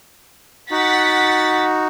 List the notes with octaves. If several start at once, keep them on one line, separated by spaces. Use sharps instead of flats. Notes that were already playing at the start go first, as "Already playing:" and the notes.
D#4 F#4 F#5 A6 B6